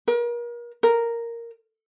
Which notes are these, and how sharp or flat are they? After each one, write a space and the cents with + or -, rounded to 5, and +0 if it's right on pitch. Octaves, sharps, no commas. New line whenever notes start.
A#4 +35
A#4 -5